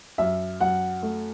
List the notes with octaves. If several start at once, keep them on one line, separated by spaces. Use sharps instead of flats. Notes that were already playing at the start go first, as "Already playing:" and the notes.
F#2 E5
F#2 F#5
A3